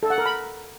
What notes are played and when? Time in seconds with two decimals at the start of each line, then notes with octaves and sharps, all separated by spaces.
0.03 A4
0.10 F#5
0.18 A#4
0.26 B5